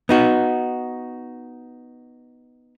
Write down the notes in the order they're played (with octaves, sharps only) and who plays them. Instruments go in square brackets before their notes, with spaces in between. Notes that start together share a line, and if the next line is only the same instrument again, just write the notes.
[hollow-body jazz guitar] B3 D#4 F#4